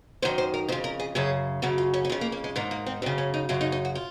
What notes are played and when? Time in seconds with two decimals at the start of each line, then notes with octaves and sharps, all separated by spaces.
0.22 F#2 D#3 C5
0.38 C5
0.54 A#4
0.68 F2 C5
0.72 C#3
0.84 A#4
1.00 G#4
1.15 F#2 C#3 G#4
1.62 F#2 C#3 F#4
1.78 F4
1.94 C#4
2.05 C#4
2.10 F2 C#3 C4
2.21 A#3
2.32 A#3
2.44 G#3
2.56 G#2 D#3 A#3
2.71 A#3
2.86 C4
3.02 F#2 C4
3.06 C#3
3.18 C#4
3.34 D#4
3.49 F#2 C#3 F4
3.61 D#4
3.72 D#4
3.85 F#4
3.95 F4